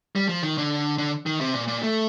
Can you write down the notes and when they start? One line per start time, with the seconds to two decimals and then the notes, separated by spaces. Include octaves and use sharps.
0.16 G3
0.29 F3
0.43 D#3
0.58 D3
0.98 D3
1.26 D#3
1.41 C3
1.54 A#2
1.68 A#2
1.83 A3